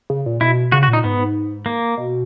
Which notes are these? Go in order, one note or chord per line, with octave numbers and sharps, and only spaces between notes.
C#3
A#2
B2 E4
C#3 F#4
F#4
A#2
D#4
G#2 B3
A#3
B2